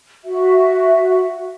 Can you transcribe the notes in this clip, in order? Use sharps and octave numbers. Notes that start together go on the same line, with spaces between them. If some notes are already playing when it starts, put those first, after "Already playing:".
F#4 E5